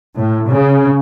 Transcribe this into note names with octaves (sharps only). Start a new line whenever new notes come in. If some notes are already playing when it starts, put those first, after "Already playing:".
A2
C#3